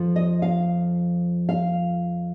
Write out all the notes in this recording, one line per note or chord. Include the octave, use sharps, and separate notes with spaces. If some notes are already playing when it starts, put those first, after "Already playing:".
Already playing: F2 F3
D#5
F5
F5